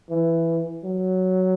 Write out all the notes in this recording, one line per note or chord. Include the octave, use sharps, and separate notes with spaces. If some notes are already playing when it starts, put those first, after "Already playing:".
E3
F#3